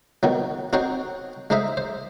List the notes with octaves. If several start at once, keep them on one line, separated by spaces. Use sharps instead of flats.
B2 D#3 F#3
C4 D#4 F#4 C5 C#5
G#3 D#4 C5 D#5 E5
C5